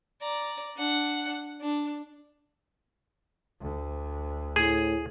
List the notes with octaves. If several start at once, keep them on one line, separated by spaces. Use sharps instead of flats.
D5 A#5
D4 F#5
D4
D2
A2 G#4